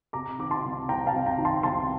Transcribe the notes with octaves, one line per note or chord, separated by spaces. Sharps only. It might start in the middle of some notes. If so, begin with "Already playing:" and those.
C3 A#5 D6
D#3 D6
A5 C6
C2
C2 G5 A#5
F5 A5
C3
G5 A#5
D#3
A5 C6
C2 A5 C6